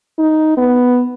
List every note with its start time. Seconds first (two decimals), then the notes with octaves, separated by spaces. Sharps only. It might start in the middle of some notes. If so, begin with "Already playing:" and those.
0.19 D#4
0.57 B3